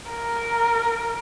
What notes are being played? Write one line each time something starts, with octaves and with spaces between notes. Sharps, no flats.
A#4